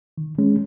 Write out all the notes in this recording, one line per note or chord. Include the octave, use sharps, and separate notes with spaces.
D#3
G#3 C#4